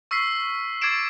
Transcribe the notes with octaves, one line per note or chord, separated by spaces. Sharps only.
C#6 E6 F6 B6 C7
D6 G#6 A6 C7 D7 E7